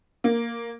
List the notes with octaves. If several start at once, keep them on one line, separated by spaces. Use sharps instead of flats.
A#3